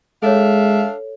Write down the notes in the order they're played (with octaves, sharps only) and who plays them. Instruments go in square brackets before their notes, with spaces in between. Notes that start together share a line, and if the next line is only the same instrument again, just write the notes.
[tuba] G#3 [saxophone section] D4 E5 F5 [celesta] A4 C#5